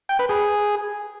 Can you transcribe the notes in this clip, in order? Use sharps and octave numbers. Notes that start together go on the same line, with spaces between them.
G5
B4
G#4